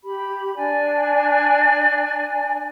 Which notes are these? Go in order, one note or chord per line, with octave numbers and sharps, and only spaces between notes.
G4 B5
D4 D5 G#5